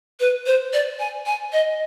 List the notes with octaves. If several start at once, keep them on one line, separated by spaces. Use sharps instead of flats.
B4
C5
D5
G#5
G#5
D#5